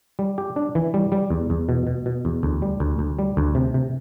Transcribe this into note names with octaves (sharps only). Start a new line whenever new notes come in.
G3
G4
D4
E3
G3
G3
E2
E2
B2
B2
B2
E2
D2
G3
D2
D2
G3
D2
C3
C3